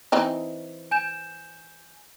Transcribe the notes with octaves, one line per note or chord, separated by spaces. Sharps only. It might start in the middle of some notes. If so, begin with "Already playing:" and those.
E3 C4 D#4
G#5 G6 E7